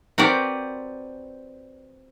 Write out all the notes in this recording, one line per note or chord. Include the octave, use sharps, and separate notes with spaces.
C4 F#4 G4 A#4 B4 D5